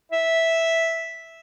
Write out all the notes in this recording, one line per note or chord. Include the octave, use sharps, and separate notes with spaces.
E5